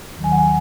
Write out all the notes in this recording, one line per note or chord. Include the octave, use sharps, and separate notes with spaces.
D#2 D#3 F#3
G#5
F#5
G#5